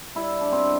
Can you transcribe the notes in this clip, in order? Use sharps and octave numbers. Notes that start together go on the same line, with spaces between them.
G3 E4
D4
B2 C4